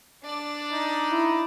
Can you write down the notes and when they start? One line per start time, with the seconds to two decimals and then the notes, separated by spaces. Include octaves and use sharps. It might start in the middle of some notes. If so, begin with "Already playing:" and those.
0.23 D4 D5
0.73 D#4
1.10 E4